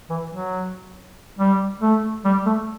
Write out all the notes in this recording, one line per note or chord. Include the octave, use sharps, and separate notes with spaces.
E3
F#3
G3
A3
G3
A3